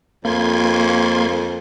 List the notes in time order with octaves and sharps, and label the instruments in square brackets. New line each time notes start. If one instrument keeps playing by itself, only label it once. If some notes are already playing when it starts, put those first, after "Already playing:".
[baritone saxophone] F2 [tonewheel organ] A#3 C6 G#6